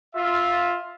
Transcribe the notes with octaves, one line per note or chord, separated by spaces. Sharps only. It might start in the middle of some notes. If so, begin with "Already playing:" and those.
F4 E5